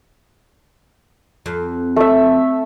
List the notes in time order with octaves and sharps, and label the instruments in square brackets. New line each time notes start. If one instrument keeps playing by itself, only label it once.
[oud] F2
[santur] A3 E5